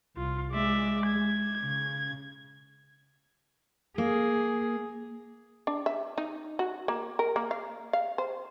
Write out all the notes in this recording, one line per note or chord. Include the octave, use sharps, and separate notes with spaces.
C2 F4
G#3 D5 E5
G#6
C#3
A#3 G#4
D4
E5
D#4
F#4
A#3
A#4
A#3
F5
F5
C5